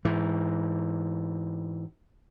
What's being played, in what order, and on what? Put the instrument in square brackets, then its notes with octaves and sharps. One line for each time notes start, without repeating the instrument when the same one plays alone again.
[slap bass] G#2 E3